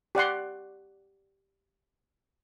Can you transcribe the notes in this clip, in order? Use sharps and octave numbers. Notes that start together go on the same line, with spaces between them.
G4 D5 F#5 C6